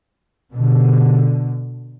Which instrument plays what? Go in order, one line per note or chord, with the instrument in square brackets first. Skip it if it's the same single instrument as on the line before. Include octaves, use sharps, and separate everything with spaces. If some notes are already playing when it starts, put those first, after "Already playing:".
[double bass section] B2 D3